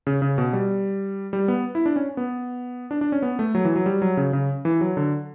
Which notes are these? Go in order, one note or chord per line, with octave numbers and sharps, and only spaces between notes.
C#3
C#3
B2
G3
G3
B3
E4
D4
C#4
B3
D4
D4
C#4
B3
A3
F#3
E3
F#3
G3
F#3
C#3
C#3
E3
F#3
D3